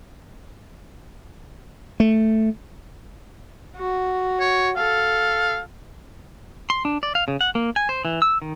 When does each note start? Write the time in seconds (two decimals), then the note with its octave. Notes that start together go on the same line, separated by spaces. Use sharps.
2.00 A3
3.76 F#4
4.40 C#5
4.76 A4 F5
6.70 C6
6.85 D4
7.03 D5
7.15 F5
7.28 C#3
7.41 F#5
7.55 A#3
7.76 G#5
7.89 C5
8.05 E3
8.22 E6
8.42 D#3